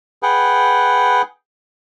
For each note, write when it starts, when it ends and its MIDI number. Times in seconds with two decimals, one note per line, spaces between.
0.23 1.22 68
0.23 1.22 71
0.23 1.22 78
0.23 1.22 79